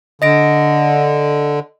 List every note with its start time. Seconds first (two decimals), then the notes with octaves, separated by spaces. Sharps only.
0.22 D3 D#5 A#6 D7